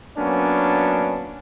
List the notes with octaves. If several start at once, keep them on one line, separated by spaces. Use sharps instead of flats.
F#3 A#3 B3 C#4 D4